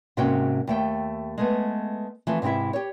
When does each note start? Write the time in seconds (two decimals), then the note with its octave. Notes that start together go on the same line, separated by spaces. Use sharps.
0.17 G#2 C3 A#3 C#4 F#4 G5
0.67 D#2 A3 G5
1.38 G#3 A3 B3
2.27 E3 F3 A3 C4
2.42 G#2 C3 C4 E4 E5
2.73 G4 C#5